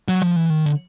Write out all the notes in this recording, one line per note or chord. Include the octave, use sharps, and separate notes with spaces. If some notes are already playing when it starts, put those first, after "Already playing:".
F#3
F3
E3
D#3
D3